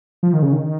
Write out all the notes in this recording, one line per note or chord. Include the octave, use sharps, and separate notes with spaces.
F3
D#3
C#3
D#3